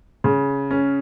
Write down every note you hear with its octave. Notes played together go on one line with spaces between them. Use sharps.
C#3
C#4